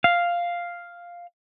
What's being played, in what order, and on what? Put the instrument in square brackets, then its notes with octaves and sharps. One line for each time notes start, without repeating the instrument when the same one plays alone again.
[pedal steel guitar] F5